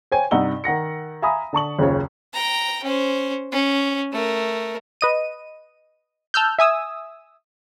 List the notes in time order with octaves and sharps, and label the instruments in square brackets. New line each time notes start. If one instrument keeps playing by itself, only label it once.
[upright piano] C5 C#5 G5 G#5
G2 C3 D#4 F#5 E6 G7
D#3 F#5 A#6 C#7
E5 F5 G#5 A#5 B5 D#6
D3 A5 C#6 F#7
F#1 D#2 C#3 F4 C#5
[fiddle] G5 A#5
C#4 C5
C#4
A3 A#4
[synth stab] B4 D#5 D#7
A5 E6 F6 G6
E5 G#5 D#6 E6